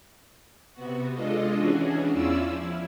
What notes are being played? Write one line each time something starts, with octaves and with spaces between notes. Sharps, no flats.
C3 B3 F#4
G#3 D4 F4 A4 D#5
E3 C#4 D4 F#4 G#4
E2 C#4 E4 F4 D5 E6
F3 E4